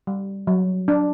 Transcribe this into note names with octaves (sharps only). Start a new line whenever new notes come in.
G3
F#3
D4